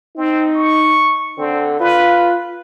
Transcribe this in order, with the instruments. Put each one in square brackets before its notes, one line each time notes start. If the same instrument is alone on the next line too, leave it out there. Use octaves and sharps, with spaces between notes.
[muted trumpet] C4 [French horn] D#4
[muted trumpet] C#6
[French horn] D3 [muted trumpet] C4
[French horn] F4 [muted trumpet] B4